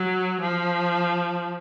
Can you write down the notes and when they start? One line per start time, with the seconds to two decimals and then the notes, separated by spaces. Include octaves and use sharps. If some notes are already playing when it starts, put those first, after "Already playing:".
Already playing: F#3
0.41 F3